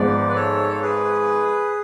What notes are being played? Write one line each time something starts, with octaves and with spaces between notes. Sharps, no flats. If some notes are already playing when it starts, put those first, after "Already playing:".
Already playing: G#1 G#2 F3 B3 D5
B4
A4 C#5
C#5
G#4 B4